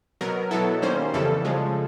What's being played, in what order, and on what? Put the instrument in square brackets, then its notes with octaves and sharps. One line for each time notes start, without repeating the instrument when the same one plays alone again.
[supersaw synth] B2 F#3 B3 A#4
B2 F#3 B3 E4 A4
D#3 G3 A#3 C#4 C5
F2 C#3 E3 G3 A4
C#3 F3 G#3